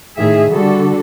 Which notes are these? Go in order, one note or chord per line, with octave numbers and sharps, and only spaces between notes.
A2 D#3 G#4 E5
D3 G3 D4 F#4 A4